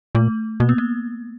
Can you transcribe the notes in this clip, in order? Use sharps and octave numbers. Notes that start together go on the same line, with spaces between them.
A#2 A3
B2 A#3
B3
A#3